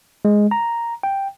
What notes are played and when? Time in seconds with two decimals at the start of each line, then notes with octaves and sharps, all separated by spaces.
0.25 G#3
0.51 A#5
1.03 G5